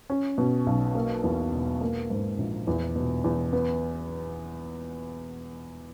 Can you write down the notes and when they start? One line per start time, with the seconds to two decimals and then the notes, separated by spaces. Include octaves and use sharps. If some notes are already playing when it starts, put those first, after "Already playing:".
0.10 C#4
0.38 B2
0.67 B1
0.95 A#3
1.24 E2
1.52 E1
1.81 A#3
2.10 G#2
2.38 A#1
2.67 E2
2.96 B2
3.24 E2
3.53 B3